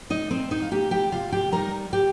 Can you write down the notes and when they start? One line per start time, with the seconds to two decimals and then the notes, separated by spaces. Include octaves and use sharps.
0.10 D#4 D#5
0.30 A#2 C4 C5
0.51 D#4 D#5
0.62 F5
0.71 A#3 D#4 G4 G5
0.91 G4 G5
1.12 C3 F4 F5
1.32 G4 G5
1.52 G3 D#4 A#4 A#5
1.93 G4 G5